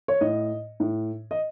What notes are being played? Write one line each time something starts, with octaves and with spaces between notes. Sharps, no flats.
C#5
A2 D#5
A2
D#5